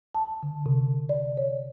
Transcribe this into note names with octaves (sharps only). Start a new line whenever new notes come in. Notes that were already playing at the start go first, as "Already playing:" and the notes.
A5
D3
C3
D5
C#5